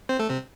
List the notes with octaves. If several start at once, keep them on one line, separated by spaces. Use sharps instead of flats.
C4 C5
A3 A4
C3 C4